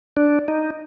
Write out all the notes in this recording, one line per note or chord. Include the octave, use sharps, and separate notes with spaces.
D4
D#4